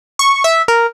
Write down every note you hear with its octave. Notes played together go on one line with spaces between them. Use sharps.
C#6
E5
A#4